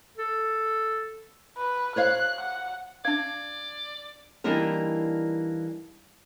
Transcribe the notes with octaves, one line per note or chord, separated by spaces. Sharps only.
A4
B4
C5 C#5 F5 F#6
F#5
D4 D5 F5 G#6
E3 G3 A#3 D4 D#4 A#4